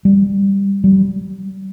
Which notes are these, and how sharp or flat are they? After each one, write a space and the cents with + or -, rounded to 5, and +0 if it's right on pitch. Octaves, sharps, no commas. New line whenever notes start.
G3 +10
G3 -30